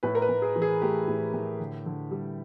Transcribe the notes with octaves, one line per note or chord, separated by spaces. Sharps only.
A2 B4
A#4
B4
A2
G#4
E3
G#4
A3 G4
A2
A2
D3
D3
G3